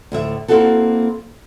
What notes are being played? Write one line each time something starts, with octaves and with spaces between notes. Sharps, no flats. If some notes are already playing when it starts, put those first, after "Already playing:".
D2 A2 E5
A#3 C4 E4 F#4 A4